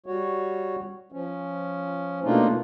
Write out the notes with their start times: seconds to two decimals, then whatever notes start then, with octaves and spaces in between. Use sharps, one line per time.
0.06 G3 F#4 C#5
1.12 F3 C#4
2.24 B2 A3 A#3 D4 D#4 F4